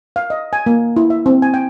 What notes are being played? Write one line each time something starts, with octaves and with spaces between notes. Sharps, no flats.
F5
D#5
G#5
A#3
E4
E5
C4
G#5
G5